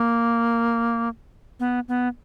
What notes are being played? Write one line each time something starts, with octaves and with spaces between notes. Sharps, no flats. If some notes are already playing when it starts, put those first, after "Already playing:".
Already playing: A#3
B3
B3